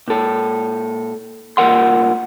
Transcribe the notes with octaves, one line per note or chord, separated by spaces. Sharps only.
A#2 A4
C2 A#2 D#3 A#4 F#5 C6